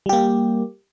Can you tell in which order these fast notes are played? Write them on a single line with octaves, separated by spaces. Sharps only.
G3 G4 A#3